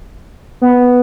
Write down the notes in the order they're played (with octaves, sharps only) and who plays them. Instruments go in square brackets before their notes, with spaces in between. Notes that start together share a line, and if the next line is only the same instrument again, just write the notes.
[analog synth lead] B3